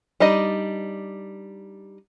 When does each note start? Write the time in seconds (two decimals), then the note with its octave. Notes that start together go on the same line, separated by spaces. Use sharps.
0.20 G3 D4 D#4 D#5